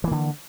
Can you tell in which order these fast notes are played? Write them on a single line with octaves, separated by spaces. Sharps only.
E3 A#3 D3